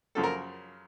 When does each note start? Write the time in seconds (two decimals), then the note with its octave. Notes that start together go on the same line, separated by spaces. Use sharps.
0.15 F#2 C#3 F3 A4
0.23 A#4